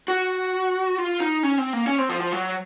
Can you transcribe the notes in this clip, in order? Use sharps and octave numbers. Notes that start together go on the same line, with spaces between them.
F#4
F4
D#4
C#4
C4
A#3
C#4
C4
F3
F3
F#3